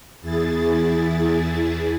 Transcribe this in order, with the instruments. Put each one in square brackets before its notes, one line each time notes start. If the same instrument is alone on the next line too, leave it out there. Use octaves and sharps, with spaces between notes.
[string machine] E2 E4 G#4 A6